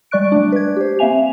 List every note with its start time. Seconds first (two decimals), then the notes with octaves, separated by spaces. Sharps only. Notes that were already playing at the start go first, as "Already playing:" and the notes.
0.11 G3 G#3 D5 C#6 F#6 D7
0.32 G3 A3 D4
0.52 B4 G#6
0.76 G4 C5
0.99 A#3 C4 E5 F5 G#5 F7